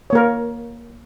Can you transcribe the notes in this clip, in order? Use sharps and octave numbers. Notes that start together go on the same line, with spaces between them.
A#3 A#4 C#5